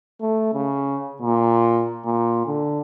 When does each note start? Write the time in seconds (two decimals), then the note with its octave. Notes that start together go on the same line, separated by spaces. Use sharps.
0.21 A3
0.53 C#3
1.22 A#2
2.05 A#2
2.46 D3